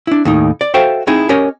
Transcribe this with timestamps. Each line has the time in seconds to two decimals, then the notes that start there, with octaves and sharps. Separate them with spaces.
0.07 D4 E4
0.25 D#2 A2 D#4
0.61 D5
0.74 F#4 A4 C5 E5 F5 G5
1.07 C4 D#4 E4 G#4
1.29 C#4 G4 A#4 C#5 D#5